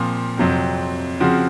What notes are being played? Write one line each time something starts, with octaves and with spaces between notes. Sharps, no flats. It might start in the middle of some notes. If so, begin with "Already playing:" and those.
Already playing: A#2 F3 C4
F2 C3 F#3 C4
C#3 F3 C4 F#4